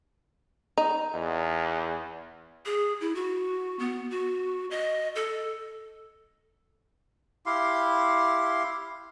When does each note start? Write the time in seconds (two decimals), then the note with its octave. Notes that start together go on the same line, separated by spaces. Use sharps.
0.78 D#4
1.14 E2
2.66 G#4
3.01 E4
3.15 F#4
3.79 B3
4.11 F#4
4.71 D#5
5.16 A4
7.46 E4 G4 F5 C6